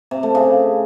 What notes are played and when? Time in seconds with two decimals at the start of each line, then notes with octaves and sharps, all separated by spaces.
0.11 C3
0.23 A3
0.35 C#3